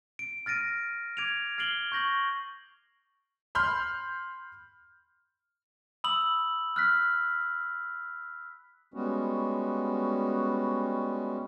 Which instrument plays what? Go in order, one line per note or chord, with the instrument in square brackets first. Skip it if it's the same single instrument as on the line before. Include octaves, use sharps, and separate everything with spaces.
[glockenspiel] D7
F6 A6 A#6 D7 D#7
D6 G#6 D7 D#7 F7
F6 A6 C7 D7 F#7 G7
C#6 G6 A#6 F#7
[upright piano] B5 C6 F6 G6
[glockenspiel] B5 D#6 E6 F#7
F6 F#6 B6
[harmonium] G3 G#3 B3 C#4 F#4